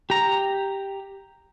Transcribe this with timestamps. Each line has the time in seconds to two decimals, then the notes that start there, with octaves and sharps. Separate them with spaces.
0.10 G4 A#5